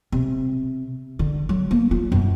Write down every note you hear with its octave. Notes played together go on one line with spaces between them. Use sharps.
C3
D3
F#3
A#3
F4
F#2